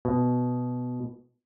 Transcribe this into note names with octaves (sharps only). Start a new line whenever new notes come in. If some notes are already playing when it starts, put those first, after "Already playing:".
B2